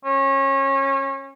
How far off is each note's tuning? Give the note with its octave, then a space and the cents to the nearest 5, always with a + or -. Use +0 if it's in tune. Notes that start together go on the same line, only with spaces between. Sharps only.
C#4 -25